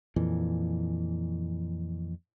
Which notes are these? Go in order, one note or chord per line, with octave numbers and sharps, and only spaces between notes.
F2 A#2 E3